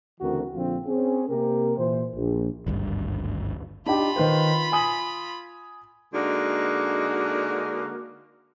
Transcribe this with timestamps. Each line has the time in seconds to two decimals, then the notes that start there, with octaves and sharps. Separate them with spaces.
0.21 D2 C#3 E3 C4 F#4 A#4
0.54 A#1 D3 F3 C4 F4
0.86 C4 C#4 G#4
1.29 C3 A#3 G4 A#4
1.77 A#2 E3 C5
2.15 A#1
2.66 G#1 D2 G2
3.86 D4 D#4 F4 G4 B5
4.16 D#3 B4 C5
4.72 G#5 D#6 F#7
6.14 D3 G#3 A#3 D4 D#4 F#4